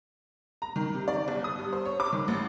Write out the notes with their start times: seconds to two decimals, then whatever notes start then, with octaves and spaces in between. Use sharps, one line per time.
0.62 A#5
0.76 D#3
0.94 C3
1.08 D5
1.28 G1
1.44 D#6
1.59 G2
1.72 C5
1.85 C#5
2.00 D6
2.12 D#3
2.28 A1